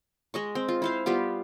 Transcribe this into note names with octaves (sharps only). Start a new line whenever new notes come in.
G#3 D#5 C#6
C4
F4
E4 C5 F5
G3 B3 F4 G4